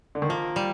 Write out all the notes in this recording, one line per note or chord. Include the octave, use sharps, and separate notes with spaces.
D3
D#3
F3 A#3
G3